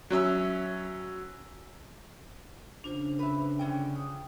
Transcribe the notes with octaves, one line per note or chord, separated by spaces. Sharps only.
F#3 C#4 E5 E6
C#3 D4 F4 C5
B4 E5
D3 C#4 G5
D#6